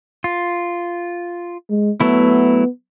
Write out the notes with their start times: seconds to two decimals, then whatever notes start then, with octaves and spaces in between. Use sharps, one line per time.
0.24 F4
1.70 G#3
2.00 F#3 A3 B3 E4